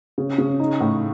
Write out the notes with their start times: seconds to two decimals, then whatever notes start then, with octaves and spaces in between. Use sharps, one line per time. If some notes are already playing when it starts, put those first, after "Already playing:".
0.18 C#3
0.38 C#3
0.60 D#4
0.81 A2